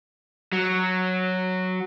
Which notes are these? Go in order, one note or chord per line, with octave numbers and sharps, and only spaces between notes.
F#3